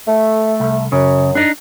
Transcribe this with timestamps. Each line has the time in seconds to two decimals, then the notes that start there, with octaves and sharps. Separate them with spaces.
0.07 A3
0.60 C2
0.92 F#2 C#3
1.35 D4 D#4